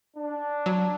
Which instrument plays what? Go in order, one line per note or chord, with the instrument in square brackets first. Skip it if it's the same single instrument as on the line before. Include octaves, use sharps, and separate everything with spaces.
[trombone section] D4
[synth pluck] F#3